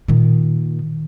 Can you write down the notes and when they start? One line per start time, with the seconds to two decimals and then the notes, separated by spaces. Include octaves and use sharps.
0.08 A#2 D#3